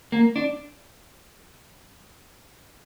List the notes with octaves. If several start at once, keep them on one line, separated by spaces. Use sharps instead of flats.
A#3
D4